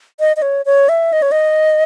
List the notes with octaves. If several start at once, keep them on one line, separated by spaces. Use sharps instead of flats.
D#5
D#5
C#5
C#5
E5
D#5
C#5
D#5